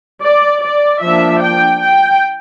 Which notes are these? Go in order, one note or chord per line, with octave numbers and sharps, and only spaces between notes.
D5
D5
F3 A#3 D4 E5
G5
G5